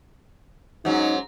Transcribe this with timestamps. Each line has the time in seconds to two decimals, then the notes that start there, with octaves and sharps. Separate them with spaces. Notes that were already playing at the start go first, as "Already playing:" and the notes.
0.85 G#2 F#3 C#4 D#4